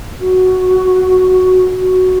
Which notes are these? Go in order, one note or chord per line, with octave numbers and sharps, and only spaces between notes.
F#4
F#4